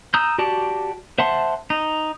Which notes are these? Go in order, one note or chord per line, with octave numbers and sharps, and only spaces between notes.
A#5 D#6 E6 G6
F#4 G4 D5 A5
C5 E5 F#5 A5 C6
D#4